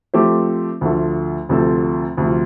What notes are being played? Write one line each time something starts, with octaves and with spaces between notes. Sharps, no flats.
F3 A3 C4 G4 C5
D2 D3 F3 A3
D2 C3 F3 C4 A4
D2 C3 F3